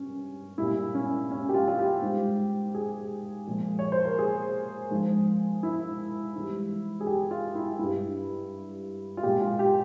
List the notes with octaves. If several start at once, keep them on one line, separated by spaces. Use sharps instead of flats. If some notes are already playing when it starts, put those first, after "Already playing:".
Already playing: G2 C#4
A#2 G3 E4
C#4
C#4
G4
F4
F4
G4
G#2 G3
G#4
A#2 F3 G#3
C#5
C5
A#4
G#4
G#2 F3 G#3
E4
G#2 E3 G3
G#4
G4
F4
E4
G2 G3 E4
F4
A#2 G#3 G4
F4
G4